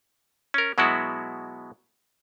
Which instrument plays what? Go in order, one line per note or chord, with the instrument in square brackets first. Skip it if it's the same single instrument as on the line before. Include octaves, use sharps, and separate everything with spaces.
[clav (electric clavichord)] C#4 A#4
B2 F#3 G#3 B3 E4 F#4